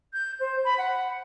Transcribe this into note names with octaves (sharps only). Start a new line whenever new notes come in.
G6
C5
B5
F#5